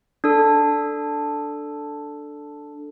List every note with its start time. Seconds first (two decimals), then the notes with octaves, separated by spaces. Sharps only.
0.24 D4 A4